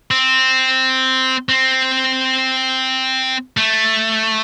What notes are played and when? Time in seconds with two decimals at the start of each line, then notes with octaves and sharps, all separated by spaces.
0.11 C4
1.49 C4
3.57 A3